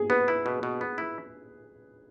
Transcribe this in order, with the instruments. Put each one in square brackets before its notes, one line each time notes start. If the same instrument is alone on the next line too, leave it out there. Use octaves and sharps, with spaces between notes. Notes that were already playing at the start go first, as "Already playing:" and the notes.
Already playing: [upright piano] G#4
[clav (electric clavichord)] B3 [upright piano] B4
[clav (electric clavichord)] E4
B2
B2
B3
E4